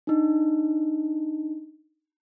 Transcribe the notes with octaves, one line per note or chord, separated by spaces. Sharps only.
D4 D#4